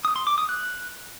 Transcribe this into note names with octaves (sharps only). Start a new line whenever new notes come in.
D#6
C6
D6
D#6
F#6